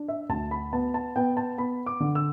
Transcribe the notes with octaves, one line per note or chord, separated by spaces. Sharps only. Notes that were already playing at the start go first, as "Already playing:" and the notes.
Already playing: D4
E5
D2 A5
B5
B3 A5
A5
B3 G5
A5
B3 B5
D6
D3
E6